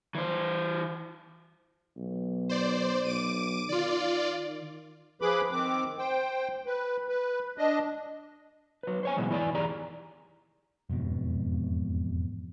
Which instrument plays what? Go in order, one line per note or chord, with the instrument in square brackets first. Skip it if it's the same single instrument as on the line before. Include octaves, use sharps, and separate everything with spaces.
[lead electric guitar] E3 C5
[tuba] B1
[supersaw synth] C5 D5
[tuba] B1 [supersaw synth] D6 D7 D#7
[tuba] D#3 [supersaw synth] F4 D5
[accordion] F3 G#4 B4 B5 D6
D#3 C4 D6
C5 G5
B4
B4
D4 D#5
[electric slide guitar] F#3 B4
C5 C#5 G#5
B2 E3 F#3 G#3
E3 E4 D5 D#5 G#5
E2 D#3 G4 G#4 D5 A#5
[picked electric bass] E1 F2 G#2 B2